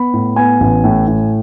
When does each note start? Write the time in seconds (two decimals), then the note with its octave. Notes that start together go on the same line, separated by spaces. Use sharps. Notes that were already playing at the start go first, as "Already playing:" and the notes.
Already playing: B3 B5
0.13 A2
0.36 B3 G#5
0.60 A1
0.84 A2
1.07 A2